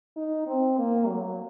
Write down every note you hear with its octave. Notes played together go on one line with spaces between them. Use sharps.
D#4
C4
A#3
F#3